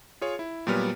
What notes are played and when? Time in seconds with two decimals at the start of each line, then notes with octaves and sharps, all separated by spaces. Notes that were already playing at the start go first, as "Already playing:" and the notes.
0.21 F4 G#4 C#5
0.39 E4
0.67 A#2 F#3 G3 B3 F6